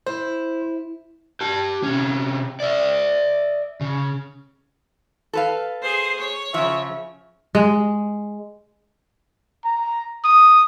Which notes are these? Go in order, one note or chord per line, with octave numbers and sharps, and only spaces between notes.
E4 C5
G4 A5
C3 C#4
D5 E5
C#3
A4 B4 F5
G#4 C5
C#5
C#3 F3 E5
G#3
A#5
D#6